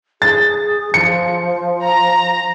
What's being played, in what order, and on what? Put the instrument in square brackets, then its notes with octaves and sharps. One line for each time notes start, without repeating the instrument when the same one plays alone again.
[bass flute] G#4 [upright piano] A6
[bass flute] F3 [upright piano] C#7
[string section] A#5